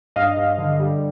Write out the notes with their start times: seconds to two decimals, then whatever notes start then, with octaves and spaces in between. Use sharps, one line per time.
0.16 G2 D#5 F5
0.37 G2
0.58 D3
0.79 G3